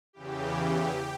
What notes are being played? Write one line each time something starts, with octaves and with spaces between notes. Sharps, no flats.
E2 C#3 E3 G4